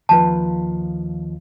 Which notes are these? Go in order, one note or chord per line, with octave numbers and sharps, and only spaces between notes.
D#2 F3 B4 A5